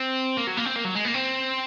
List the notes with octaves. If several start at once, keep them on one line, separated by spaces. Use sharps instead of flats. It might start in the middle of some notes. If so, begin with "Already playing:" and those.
Already playing: C4
A#3
F#3
A#3
C4
A#3
F#3
G#3
A#3
C4